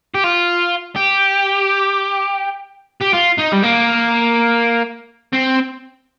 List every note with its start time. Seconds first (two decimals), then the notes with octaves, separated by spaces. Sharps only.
0.14 G4
0.24 F4
0.96 G4
3.01 G4
3.14 F4
3.39 D#4
3.53 G3
3.63 A#3
5.33 C4